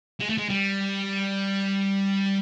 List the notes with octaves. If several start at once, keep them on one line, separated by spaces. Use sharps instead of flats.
G#3
A3
G#3
G3